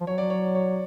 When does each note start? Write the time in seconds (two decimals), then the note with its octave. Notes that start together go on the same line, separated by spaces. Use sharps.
0.01 F3
0.07 F#3 C#5
0.18 D5
0.30 C#5
0.55 C#5